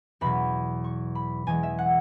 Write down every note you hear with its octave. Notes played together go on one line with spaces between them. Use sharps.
E2 B2 F#3 B5
C#6
B5
E2 E3 G#3 G#5
E5
F#5